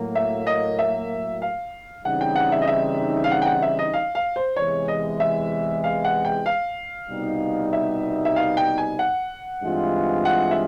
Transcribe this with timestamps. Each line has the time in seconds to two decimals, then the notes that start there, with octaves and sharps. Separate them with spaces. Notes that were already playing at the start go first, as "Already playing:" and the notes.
Already playing: A2 F#3 A#3
0.15 E5
0.47 D#5
0.79 E5
1.42 F5
2.05 C#3 E3 G3 C4 D#4 F#5
2.21 G5
2.36 F#5
2.52 E5
2.62 D#5
2.68 E5
3.24 F5
3.31 F#5
3.42 G5
3.46 F#5
3.62 E5
3.79 D#5
3.93 F5
4.15 F5
4.36 C5
4.56 E2 C3 E3 G#3 C#5
4.88 D#5
5.20 E5
5.84 F5
6.04 F#5
6.25 G5
6.46 F5
7.10 C2 B2 G3 B3 D#4
7.73 E5
8.25 E5
8.36 F5
8.57 G5
8.78 G#5
8.99 F#5
9.62 G2 E3 G#3 C4 F4
10.25 F#5
10.51 E5